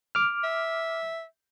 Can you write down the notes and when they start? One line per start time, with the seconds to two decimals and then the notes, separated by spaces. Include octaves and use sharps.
0.15 D6 F6
0.44 E5